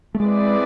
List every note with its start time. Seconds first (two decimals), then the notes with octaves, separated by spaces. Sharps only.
0.15 A3
0.20 G#3 C4 E4 G#4 B4 D5